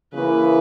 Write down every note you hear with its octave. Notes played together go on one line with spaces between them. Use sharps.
C#3 E3 A#3 E4 B4